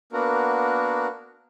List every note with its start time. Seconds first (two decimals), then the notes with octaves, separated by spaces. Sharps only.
0.13 A#3 B3 D4 F#4 A#4